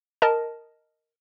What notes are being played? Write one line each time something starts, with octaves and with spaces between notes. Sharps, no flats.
A#4 D#5 A5